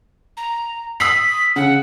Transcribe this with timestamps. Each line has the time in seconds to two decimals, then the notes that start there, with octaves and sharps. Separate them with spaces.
0.37 A#5
1.00 D#6 E6 B6 C7
1.56 C#3 F#5